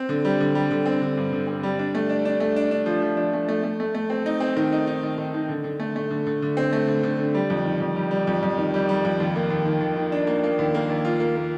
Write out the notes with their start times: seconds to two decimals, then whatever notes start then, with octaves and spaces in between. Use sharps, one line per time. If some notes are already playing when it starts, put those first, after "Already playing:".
Already playing: C4
0.09 D3
0.25 G3
0.40 D3
0.55 G3
0.71 D3
0.86 C4
1.02 D3
1.17 G2
1.32 D3
1.47 C4
1.63 G3
1.79 D4
1.95 A3
2.09 D4
2.25 D4
2.40 A3
2.56 D4
2.71 D4
2.86 F3
3.02 F3
3.17 D4
3.34 A3
3.49 A3
3.63 A3
3.80 A3
3.95 A3
4.10 C4
4.26 D#4
4.40 C4
4.57 D#3
4.72 D#4
4.87 D#4
5.03 D#3
5.18 D#3
5.34 D#3
5.49 D3
5.64 D3
5.80 A3
5.96 A3
6.10 D3
6.27 D3
6.42 D3
6.57 C4
6.73 A3
6.87 D3
7.03 D3
7.18 D3
7.34 G3
7.50 F2
7.65 D#3
7.80 F2
7.96 G3
8.11 G3
8.27 F2
8.43 F2
8.58 D#3
8.74 G3
8.89 G3
9.05 F2
9.20 D#2
9.35 A#3
9.50 D#2
9.65 D#3
9.81 D#2
9.97 D#3
10.12 D4
10.27 A#3
10.44 A#3
10.59 D#2
10.74 A#3
10.90 D#2
11.05 F4
11.20 A#3
11.36 A#3